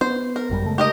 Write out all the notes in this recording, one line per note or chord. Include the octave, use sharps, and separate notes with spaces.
B3 C5
A#4
G#1 F#2 G3
C#3 G#3 A3
G4 A#4 D#5